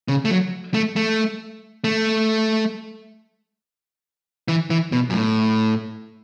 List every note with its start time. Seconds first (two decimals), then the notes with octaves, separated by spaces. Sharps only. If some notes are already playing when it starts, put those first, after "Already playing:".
0.08 C#3
0.25 A3
0.31 F#3
0.74 A3
0.96 A3
1.84 A3
4.48 E3
4.70 E3
4.92 B2
5.10 F#2
5.14 A2